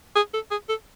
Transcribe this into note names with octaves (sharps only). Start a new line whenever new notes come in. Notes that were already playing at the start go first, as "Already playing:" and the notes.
G#4
A4
G#4
A4